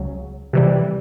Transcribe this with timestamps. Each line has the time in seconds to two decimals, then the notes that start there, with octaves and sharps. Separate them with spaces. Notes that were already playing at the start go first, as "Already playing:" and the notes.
Already playing: C#2 C#3 F#3
0.53 C3 E3 G3